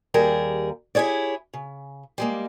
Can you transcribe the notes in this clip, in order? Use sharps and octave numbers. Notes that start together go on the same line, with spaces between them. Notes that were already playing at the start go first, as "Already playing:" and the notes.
D#2 G3 G#4 A#4
E4 G4 G#4 C#5 D5
C#3
G3 G#3 A#3